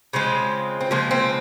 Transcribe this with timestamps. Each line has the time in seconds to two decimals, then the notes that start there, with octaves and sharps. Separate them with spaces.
0.13 C#3 F3 G#3 C4
0.81 C4
0.91 C#3 F3 G#3 A#3
1.11 C4